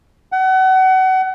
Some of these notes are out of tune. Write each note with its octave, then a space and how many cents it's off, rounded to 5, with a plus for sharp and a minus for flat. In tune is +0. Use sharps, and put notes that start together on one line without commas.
F#5 +30